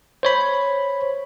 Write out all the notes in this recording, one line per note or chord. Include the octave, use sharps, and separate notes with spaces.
C5 C#5 B5